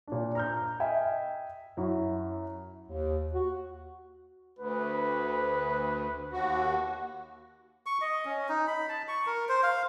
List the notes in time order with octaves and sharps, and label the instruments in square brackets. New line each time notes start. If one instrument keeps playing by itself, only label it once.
[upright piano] A#2 D4
A#5 F6 G6
D#5 E5 G5 G#5
F#2 E4 F#4
[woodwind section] D#2
F#4
[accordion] D2 [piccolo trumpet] B4
[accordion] D#2 F#4
[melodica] C#6
D#5
C#4
D#4
B5
A5
C#6
A#4
C5
F5